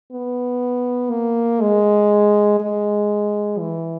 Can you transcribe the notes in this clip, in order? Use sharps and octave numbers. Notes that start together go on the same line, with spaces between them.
B3
A#3
G#3
G#3
E3